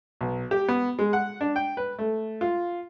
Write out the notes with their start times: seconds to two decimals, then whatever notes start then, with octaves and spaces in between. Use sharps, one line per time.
0.21 B1
0.51 G4
0.68 B3
0.99 G#3
1.13 F#5
1.41 D4
1.56 G5
1.77 B4
1.99 A3
2.41 F4